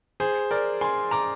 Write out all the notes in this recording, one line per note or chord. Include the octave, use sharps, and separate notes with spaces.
G#4 C5
A#4 D5
G#5 C6
A#5 D6